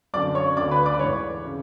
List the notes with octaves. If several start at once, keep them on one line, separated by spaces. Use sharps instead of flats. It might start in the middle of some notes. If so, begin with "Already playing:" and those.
F#2 D3 D5 D6
C#5 C#6
D2 D3 D5 D6
B4 B5
D5 D6
G#2 E3 C#5 C#6
C#3